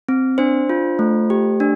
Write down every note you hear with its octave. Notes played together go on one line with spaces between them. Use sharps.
C4
D4 C5
F4
A3
G4
D4